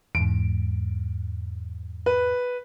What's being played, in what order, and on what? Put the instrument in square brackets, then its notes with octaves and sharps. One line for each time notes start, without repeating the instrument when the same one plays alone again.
[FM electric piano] E2 G#2 [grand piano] D7
[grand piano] B4